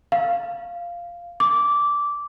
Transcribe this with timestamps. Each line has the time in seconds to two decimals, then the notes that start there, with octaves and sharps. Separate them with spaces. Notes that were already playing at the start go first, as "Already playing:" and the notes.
0.12 F5
1.40 D6